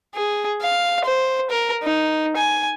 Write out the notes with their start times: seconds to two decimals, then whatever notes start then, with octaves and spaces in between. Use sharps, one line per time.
0.15 G#4
0.62 F5
1.05 C5
1.50 A#4
1.83 D#4
2.37 G#5